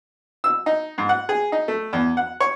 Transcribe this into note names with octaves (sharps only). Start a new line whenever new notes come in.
E6
D#4
G#2
F#5
G#4
D#4
A3
E2
F#5
C#5